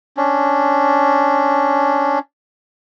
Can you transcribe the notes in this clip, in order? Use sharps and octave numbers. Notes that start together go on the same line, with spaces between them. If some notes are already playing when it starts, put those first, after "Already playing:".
C#4 D4